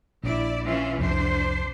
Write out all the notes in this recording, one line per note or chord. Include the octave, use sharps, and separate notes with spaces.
A#1 E4 D5
E3 C#4 F4
C2 F2 D4 C5